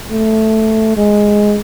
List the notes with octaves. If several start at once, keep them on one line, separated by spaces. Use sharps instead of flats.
A3
G#3